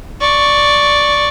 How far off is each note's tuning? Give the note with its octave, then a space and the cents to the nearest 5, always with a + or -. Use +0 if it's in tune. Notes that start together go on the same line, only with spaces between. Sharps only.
D5 +0 C#6 +0